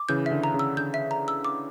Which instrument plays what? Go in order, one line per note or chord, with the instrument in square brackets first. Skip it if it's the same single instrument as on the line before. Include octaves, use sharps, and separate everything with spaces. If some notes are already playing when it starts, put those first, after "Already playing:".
Already playing: [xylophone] D6
[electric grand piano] C#3 E3 [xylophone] G6
[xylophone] E5
[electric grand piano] D3
[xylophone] A#5
[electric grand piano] C#3
[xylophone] E6
[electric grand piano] D3 [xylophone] G6
[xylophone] E5
A#5
E6
D6